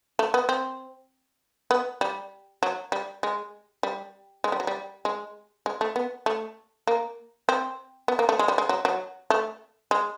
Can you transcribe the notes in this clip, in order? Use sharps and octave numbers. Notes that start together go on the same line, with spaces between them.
A3
B3
C4
B3
G3
F#3
G3
G#3
G3
G#3
G3
F#3
G3
G#3
G#3
A3
B3
A3
A#3
C4
B3
A#3
A3
G#3
G3
G#3
F#3
F#3
A3
G#3